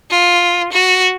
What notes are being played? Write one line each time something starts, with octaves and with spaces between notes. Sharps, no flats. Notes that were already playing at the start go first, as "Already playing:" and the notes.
F4
F#4